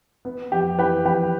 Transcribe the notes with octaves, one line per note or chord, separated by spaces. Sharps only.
B3
F2 G4
E3 G4 B4
F2 G4 B4